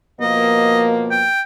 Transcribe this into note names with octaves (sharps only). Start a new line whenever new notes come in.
B2 F3 A#3 D#5
G5